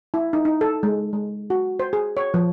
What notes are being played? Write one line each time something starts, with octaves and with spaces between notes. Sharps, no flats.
E4
D#4
D#4
A4
G#3
G#3
F#4
C5
G#4
C#5
F3